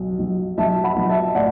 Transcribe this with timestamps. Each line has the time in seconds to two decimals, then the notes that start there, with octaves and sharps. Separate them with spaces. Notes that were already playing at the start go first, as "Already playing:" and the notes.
Already playing: B1
0.19 B1
0.58 B1 E5 A5
0.84 F#5 B5
0.97 B1
1.09 E5 A5
1.35 A2 D5 F#5